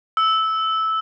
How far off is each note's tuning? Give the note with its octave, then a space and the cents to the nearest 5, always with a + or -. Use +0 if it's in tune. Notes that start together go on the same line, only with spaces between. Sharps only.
E6 -10